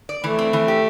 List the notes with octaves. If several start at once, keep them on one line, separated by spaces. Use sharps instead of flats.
D5
E3 A3
C4
E3
G4